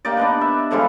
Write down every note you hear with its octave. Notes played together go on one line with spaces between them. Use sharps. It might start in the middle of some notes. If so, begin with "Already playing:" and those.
A#3 D#4 G4 D5
B3 D4 B4
E5
D3 F3 G3 G#3